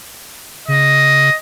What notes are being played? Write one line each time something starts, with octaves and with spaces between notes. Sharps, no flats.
C#3 D#5